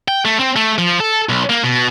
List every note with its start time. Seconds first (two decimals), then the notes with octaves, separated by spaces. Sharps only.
0.08 G5
0.25 A3
0.39 C4
0.56 A3
0.78 F3
1.00 A4
1.29 B1
1.50 A#3
1.64 B2